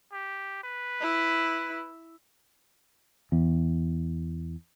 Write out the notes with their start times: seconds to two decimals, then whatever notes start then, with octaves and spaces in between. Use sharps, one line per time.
0.12 G4
0.64 B4
1.01 E4
3.32 E2